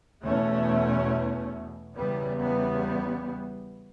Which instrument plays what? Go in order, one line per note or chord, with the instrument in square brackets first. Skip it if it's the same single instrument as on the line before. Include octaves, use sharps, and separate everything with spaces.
[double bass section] E2 B2 A3 C#4
E2 C#3 G3 B3
G3 B3